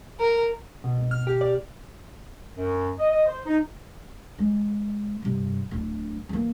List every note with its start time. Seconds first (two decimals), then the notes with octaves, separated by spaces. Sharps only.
0.20 A#4
0.84 B2
0.98 G#1
1.11 F6
1.27 G4
1.41 D5
2.56 F#2
2.99 D#5
3.11 D#5
3.26 C5
3.46 D#4
4.39 G#3
5.23 G2 C3
5.71 D1 D4
6.29 E3 A#3